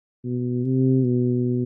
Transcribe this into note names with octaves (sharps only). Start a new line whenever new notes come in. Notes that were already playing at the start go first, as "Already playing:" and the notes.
B2
C3
B2